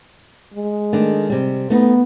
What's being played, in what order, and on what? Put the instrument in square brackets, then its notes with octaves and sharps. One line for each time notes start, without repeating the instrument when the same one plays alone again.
[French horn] G#3
[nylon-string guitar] D#3 A3 D4
C3 G3
[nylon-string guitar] A3 D#4 [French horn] B3